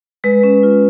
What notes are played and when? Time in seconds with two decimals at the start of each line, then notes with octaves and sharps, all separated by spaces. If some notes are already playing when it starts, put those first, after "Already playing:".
0.24 G#3 B4
0.43 C#4
0.63 F4